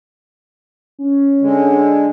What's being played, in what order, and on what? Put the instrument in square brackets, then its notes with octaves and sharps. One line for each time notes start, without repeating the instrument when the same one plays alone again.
[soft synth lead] C#4
[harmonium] D3 G#3